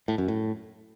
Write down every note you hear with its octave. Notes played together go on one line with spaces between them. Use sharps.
A2
F#2
A2